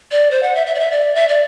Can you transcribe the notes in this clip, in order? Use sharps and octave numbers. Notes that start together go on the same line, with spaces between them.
D5
C5
F#5
E5
E5
D5
E5
D5
E5
D5